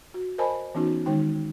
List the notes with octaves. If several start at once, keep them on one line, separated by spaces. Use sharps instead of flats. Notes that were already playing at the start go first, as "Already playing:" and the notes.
F#4
A#4 C5 D#5 G#5 A5 B5
E3 B3 C#4 D#4 F#4
D#3 G#3 D#4 G5